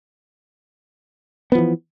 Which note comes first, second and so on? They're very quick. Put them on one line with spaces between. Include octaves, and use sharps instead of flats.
B3 F3 E3